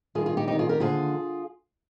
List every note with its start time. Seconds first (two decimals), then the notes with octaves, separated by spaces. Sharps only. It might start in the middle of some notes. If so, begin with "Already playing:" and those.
0.15 G2 D#3 F4 G#4
0.26 F4 G#4
0.37 D#4 G4
0.48 F2 D#3 D#4 G4
0.59 F4 G#4
0.69 G4 A#4
0.80 D#2 D3 F3 F4 G#4